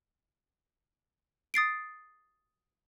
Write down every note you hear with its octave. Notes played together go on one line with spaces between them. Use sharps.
D#6 A6 C7 D7